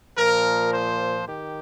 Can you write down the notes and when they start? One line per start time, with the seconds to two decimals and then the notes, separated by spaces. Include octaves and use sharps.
0.17 A#2 F3 A#4
0.73 C5
1.27 D#3 G4